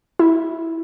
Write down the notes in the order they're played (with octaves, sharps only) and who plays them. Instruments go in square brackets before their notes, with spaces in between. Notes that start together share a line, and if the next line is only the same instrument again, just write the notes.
[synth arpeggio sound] E4